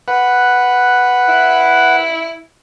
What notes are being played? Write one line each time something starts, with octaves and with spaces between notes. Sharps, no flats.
B4 F#5
E4